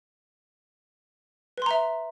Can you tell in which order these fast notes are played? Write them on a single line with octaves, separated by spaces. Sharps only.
B4 C6 A#5 E5